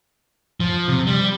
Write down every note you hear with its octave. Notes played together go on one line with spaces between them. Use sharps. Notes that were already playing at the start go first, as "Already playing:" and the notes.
F3
C3
G3